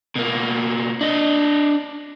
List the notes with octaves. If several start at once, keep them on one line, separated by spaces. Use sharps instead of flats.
B2 A#3
D4 D#5